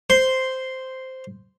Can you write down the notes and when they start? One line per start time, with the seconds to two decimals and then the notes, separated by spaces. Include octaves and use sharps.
0.10 C5 C6